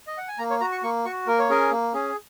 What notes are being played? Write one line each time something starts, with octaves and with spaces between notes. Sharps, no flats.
D#5
F#5
G#5
A#3 A#5
C#5
F#4 A#5
C#6
A#3 C#6
F#4 C#6
A#3 A#4
C#5
C#4 G#4 A#4
A#3
C#4 G#4